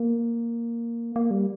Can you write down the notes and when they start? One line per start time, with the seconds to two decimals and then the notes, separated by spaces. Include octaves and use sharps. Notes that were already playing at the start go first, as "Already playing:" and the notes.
Already playing: A#3
1.16 A#3
1.31 G3